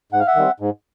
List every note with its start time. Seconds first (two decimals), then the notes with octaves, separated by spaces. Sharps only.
0.12 G#2 F#5
0.20 F5
0.27 E5 F#5
0.36 D#3 G3 C4
0.60 G#2